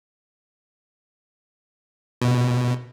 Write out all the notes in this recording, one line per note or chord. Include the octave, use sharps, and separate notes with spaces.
B2